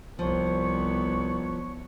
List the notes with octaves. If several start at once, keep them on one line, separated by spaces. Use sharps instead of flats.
C2 F3 B3 C#5